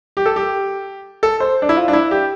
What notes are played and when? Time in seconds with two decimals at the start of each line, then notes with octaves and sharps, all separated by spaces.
0.17 G4
0.26 A4
0.36 G4
1.23 A4
1.40 C5
1.62 D4
1.69 E4
1.77 F4
1.88 D4
1.93 E4
2.11 G4